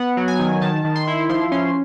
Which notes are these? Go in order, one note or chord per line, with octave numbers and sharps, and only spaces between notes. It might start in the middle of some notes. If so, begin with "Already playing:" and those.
Already playing: B3 F#5
F#3
G#5
D#3
D#3 A5
D#3
C6
E4
F3 C6
C#4 C6